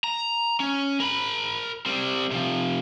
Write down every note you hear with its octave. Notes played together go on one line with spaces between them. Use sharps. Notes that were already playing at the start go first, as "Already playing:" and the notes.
A#5
C#4
A#4 B5
G3 C4
C3 F3